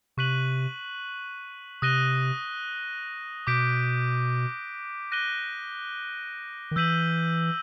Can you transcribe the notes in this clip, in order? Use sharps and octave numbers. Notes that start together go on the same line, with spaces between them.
C3 C#6 F#6 B6 D#7 F#7
C3 D#6 F#6 A#6 D#7 G7
B2 D6 G6 B6 D7
F#6 A#6 D#7 G7
D#3
E3 E6 G6 B6 D#7 F#7